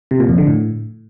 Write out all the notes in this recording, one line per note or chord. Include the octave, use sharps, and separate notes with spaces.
C3
A#2
F2
D3
A2